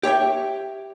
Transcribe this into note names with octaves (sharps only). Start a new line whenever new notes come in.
G4 C#5 E5 G5